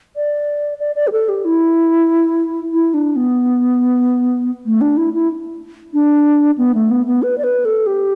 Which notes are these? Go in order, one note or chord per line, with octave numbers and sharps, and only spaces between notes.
D5
D5
D5
G4
A4
G4
E4
E4
D4
B3
A3
D4
E4
E4
D4
B3
A3
B3
B3
B4
D5
B4
A4
G4